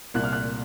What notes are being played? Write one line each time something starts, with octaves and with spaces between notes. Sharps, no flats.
C2 A#2 F#6
F6
F#6